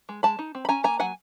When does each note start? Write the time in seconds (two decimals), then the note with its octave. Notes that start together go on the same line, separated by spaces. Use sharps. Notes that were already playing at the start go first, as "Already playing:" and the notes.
0.09 G#3
0.23 G#3 A5 B5
0.39 D#4
0.55 C4
0.65 B5
0.69 C#4 G#5 A#5
0.84 A#3 G#5 A#5
0.99 F#3 F#5 G#5